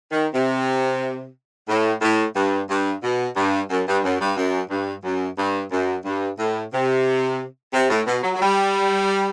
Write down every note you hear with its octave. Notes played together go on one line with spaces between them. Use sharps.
D#3
C3
A2
A2
G2
G2
B2
G2
F#2
G2
F#2
G2
F#2
G2
F#2
G2
F#2
G2
A2
C3
C3
A2
B2
F#3
F#3
G3